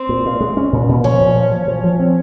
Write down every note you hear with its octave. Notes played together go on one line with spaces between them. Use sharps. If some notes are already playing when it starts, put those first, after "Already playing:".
Already playing: C4
A#2
A#2
G#3
C#4
A#2
A#2
F3 C#4
A#2
F3
F3
F3
F3
C4